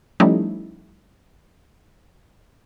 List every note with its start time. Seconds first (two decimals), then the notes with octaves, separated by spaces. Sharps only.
0.20 F3 G3 A3 C#4 D#4 E4